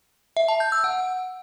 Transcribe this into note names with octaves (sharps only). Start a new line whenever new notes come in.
E5
A5
G6
E6
F#5